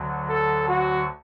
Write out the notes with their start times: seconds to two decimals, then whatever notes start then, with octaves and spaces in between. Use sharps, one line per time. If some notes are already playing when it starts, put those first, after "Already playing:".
Already playing: D2 D3 F#3
0.29 A4
0.68 F#4